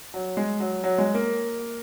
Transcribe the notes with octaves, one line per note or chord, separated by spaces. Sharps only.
F#3
G#3
F#3
F#3
G#3
A#3